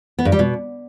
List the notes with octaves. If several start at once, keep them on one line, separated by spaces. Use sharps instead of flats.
B3
G2
G3
B2